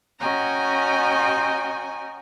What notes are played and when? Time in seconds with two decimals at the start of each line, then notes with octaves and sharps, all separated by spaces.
0.21 C#4 F#4 D#5 G5 G#5 A#5